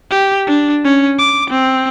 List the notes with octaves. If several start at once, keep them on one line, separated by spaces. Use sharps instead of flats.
G4
D4
C#4
D6
C4